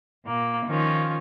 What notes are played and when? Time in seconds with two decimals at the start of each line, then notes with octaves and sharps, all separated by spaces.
0.25 A#2 A#3
0.66 D#3 F3 C#4 F4